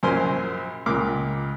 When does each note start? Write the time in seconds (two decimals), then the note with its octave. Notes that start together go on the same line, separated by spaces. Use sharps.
0.03 A#1 F#2 A#4 C5 G#5 C6
0.86 C#2 A#2 A#4 D6